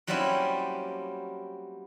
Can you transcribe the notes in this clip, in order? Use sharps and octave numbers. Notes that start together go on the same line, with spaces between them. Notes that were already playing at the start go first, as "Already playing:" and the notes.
F#3 G3 A#3 C4 C#4 E4